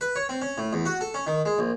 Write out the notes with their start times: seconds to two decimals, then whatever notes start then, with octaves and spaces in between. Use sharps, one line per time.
0.01 B4
0.16 C#5
0.29 C4
0.42 C#4
0.58 A2
0.73 E2
0.86 F#4
1.01 A4
1.14 C#4
1.27 D#3
1.46 G#3
1.59 A#1